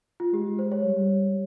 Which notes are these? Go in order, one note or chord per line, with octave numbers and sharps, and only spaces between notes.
F4
G#3 G4
C5
C#5
G3